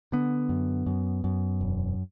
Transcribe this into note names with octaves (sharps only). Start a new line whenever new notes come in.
D3 B3
F#2
F#2
F#2
E1